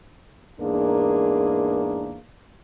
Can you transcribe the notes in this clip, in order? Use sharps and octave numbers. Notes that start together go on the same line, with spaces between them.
E2 G#2 A#3 D4 G#4 A#4